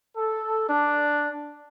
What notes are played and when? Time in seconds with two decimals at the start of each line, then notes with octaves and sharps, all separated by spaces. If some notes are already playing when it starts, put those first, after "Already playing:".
0.17 A4
0.68 D4